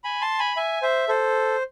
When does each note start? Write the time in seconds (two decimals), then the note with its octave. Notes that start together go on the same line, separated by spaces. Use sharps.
0.04 G#5 B5
0.21 A5 C6
0.39 G#5 B5
0.57 E5 G#5
0.82 C5 E5
1.08 A4 C5